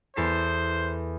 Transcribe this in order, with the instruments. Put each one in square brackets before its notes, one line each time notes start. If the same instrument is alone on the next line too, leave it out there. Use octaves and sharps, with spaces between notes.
[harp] E2 A4 C7 [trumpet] C5